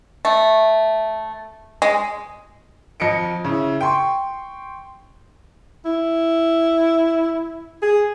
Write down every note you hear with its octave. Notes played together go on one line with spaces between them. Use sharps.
A3
G#3
F2 D#5 C#7 D7
C#3 E4
G5 C6 C#6
E4
G#4